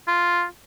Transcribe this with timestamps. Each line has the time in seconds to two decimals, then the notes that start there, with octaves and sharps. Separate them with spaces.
0.07 F4